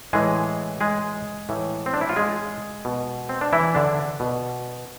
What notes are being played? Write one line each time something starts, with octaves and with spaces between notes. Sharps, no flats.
A2 E3 G#3 G#4
G#3 G#4
A2 E3
C4
D4
E4
F4
G#3 G#4
B2
C4
D4
E3 E4
D3 D4
B2